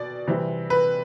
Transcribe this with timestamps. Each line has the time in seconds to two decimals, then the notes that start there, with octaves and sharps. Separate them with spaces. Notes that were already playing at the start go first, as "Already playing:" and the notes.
Already playing: B2 D5
0.28 C3 E3 G3
0.70 B4